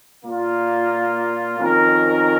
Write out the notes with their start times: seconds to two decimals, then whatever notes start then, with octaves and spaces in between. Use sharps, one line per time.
0.23 A#2 A#3 F4
1.58 F2 D#3 C#4 A#4